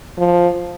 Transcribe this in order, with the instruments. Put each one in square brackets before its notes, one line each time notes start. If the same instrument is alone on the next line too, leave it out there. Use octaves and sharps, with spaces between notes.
[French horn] F3